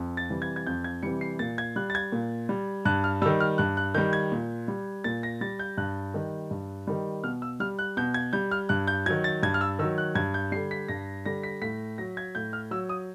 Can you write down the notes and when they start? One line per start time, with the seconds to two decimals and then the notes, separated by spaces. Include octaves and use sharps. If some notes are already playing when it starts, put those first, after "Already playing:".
Already playing: F2
0.17 A6
0.30 C3 E3 G3
0.42 G#6
0.56 G#6
0.66 F2 G6
0.84 G#6
1.03 C3 E3 G3 C#7
1.21 C7
1.39 A#2 A6
1.58 G#6
1.76 G3 F#6
1.90 A6
1.95 G#6
2.12 A#2
2.49 G3
2.85 G2 F#6
3.04 F6
3.22 G3 E6
3.26 D#3
3.40 F6
3.58 G2 F#6
3.77 F#6
3.94 D#3 G3 G6
4.13 G#6
4.32 A#2
4.68 G3
5.04 A#2 A6
5.23 A#6
5.41 G3 A6
5.59 G6
5.78 G2 F#6
6.14 D#3 G3
6.51 G2
6.87 D#3 G3
7.24 B2 F6
7.42 E6
7.60 G3 F6
7.79 F#6
7.97 B2 G6
8.14 G#6
8.33 G3 G6
8.51 F6
8.69 G2 F#6
8.87 G6
9.06 D#3 F#3 G#6
9.24 A6
9.43 G2 G#6
9.54 F6
9.61 E6
9.79 D#3 E6
9.83 F#3
9.98 F#6
10.15 G2 G#6
10.34 G6
10.52 G3 C7
10.56 D3
10.71 B6
10.88 G2 A#6
11.25 D3 G3 A#6
11.43 B6
11.62 A2 B6
11.98 F#3 A#6
12.17 G#6
12.35 A2 G6
12.53 F6
12.71 F#3 E6
12.89 D#6